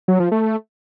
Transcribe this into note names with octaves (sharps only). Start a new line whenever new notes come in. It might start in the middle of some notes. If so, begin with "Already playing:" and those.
F#3
F3
A3